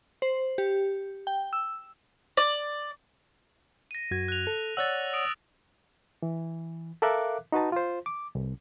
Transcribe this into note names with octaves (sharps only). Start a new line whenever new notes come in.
C5
G4
G5
E6
D5
A#6 D#7
F#2 F#4 G#6
F#6 F7
A4
C#5 D5 F#5 E6 F#6 A6
D#6 D7 F7
E3
A4 A#4 E5 F5 D6 F#6
D#4 F#4 B4 A5
F4 C5
D6
C2